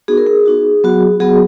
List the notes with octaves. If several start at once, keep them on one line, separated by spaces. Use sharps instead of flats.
B3 D#4 F#4 G#4
A#4
G#4
B3 D#4 F#4
F#3 B3 F#4
F#3 B3 F#4 G#4